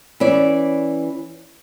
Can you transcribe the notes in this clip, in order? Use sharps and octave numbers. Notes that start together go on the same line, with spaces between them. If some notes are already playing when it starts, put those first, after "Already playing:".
E3 C#4 D5